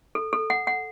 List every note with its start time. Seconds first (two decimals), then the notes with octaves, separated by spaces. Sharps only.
0.15 A4
0.33 A4
0.50 F#5
0.67 F#5